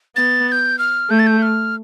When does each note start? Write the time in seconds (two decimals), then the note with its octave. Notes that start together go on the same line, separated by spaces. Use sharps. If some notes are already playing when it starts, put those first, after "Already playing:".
0.16 B3 A6
0.49 A6
0.52 G6
0.79 F6
1.10 A3 G6
1.19 A6
1.27 G6
1.42 F6